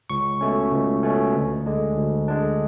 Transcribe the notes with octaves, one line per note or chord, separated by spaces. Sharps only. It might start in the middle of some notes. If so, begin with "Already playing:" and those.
C#2 C#6
B2 A3 C#4
C#2
B2 A3 C#4
D2
D3 G#3 D4
D2
D3 G#3 D4